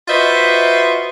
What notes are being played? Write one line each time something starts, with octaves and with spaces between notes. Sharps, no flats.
F4 F#4 B4 C5 D#5 E5